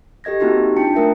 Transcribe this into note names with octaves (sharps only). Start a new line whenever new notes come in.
G4 A4 D#5 G#6 A#6
A#3 C4 D#4 E4 F#4 G4
D4 F4 G5 A5 C#7
A3 A#4 E5